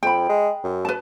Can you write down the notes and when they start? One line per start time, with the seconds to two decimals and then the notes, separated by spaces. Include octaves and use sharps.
0.03 F2 G5 B5
0.29 G#3
0.64 F#2
0.85 B4 A5